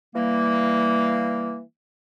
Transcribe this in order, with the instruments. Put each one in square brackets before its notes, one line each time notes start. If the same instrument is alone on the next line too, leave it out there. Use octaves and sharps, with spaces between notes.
[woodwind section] E3 G3 A#3